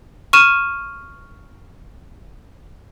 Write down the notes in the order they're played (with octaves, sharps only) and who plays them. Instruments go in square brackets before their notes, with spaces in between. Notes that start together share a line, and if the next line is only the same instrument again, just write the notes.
[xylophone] C#6 F6 D#7 E7